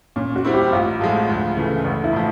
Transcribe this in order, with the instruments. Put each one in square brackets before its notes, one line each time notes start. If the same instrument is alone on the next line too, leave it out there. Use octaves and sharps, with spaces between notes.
[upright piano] A#2 [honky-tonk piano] C#4
[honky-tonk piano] F#4
[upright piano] G3 C4 E4
[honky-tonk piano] G4
[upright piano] A1 [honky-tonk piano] F4
[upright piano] A2 F3 G#3
D2
C#3 E3 A3
A1
[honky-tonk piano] E4
[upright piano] A2 F3